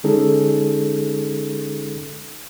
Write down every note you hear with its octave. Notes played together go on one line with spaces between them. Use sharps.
D3 G#3 C#4 D#4 G#4 A4